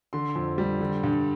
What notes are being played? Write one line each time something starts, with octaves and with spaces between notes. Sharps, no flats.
D3 C6
F2
G3
D3
G2